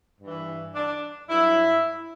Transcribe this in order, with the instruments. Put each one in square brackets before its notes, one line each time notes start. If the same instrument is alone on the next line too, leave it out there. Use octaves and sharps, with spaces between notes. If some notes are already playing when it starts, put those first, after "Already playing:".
[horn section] G2
E3
D4
G2 F#3 E4